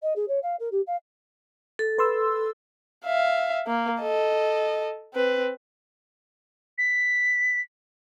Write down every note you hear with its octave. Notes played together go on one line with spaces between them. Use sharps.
D#5
G#4
C#5
F5
A#4
G4
F5
A4
B4 C6 E6
E5 F5
A#3
A4 D#5
C4 B4
B6